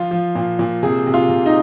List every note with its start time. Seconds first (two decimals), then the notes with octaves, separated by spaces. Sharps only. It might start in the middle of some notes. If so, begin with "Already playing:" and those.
Already playing: F3 F4
0.11 F3
0.35 A#2
0.59 A#2
0.83 C3 G#4
1.06 C3
1.14 F4
1.29 C3
1.46 D#4